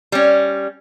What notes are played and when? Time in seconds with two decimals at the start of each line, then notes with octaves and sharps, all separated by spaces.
0.12 G3 C#4